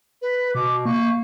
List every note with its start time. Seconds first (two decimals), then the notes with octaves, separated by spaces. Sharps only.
0.22 B4
0.55 B2 D6
0.85 A#3 C#6